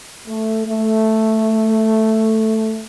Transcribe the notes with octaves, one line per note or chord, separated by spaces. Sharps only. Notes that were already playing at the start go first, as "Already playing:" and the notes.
A3
A3